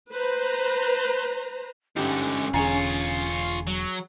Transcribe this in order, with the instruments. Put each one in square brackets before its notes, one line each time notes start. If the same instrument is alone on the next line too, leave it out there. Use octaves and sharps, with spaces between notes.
[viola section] B4 C5 A#5
[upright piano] G1 G4 [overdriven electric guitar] G#2 D3 [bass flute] C#4
[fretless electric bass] E1 E2 D3 [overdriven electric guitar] F4 C#5 [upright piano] G#4 G#5 A#5
[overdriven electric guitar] F#3